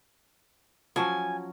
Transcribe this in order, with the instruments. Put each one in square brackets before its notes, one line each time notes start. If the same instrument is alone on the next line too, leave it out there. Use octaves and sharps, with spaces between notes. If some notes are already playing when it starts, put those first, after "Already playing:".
[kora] F3 F#3 C#4 [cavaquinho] G#5